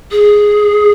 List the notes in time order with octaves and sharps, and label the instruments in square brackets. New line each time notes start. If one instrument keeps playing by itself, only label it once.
[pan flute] G#4